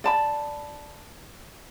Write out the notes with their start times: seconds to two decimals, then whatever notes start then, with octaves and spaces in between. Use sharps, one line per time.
0.04 D5 A5 B5